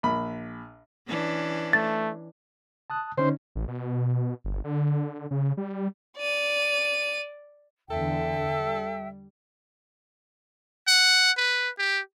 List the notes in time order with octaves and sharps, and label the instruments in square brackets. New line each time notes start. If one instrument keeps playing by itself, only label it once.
[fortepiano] A#1 B5
[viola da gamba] E3 C#4 D4
[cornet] A3 [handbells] A6
[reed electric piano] A5 D#6 F#6
[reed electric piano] D3 C#4 D#4 [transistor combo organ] C5
[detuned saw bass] A1
B2
G1
D3
C#3
G3
[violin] D5 D#7
[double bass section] E2 D3 [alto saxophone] A4 [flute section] E5 G5
[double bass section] G3
[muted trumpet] F#5
B4
G4